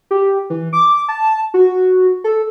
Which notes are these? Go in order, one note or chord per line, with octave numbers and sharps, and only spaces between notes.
G4
E3
D6
A5
F#4
A4